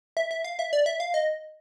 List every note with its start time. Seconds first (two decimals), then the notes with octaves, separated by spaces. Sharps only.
0.17 E5
0.31 E5
0.44 F5
0.59 E5
0.73 D5
0.86 E5
1.00 F5
1.14 D#5